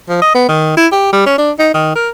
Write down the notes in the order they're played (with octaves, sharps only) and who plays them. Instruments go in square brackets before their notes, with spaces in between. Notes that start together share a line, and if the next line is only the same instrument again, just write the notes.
[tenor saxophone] F3
D#5
B3
D#3
E4
G4
G3
C#4
D4
D#4
D#3
A#4